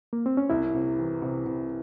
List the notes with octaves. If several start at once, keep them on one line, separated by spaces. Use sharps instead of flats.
A#3
C4
C#4
C2 E4
C3
E3
C3
C3